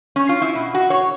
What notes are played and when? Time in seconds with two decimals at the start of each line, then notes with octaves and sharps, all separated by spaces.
0.16 C#4
0.29 F4
0.42 E4
0.55 B2
0.75 F#4
0.90 C#5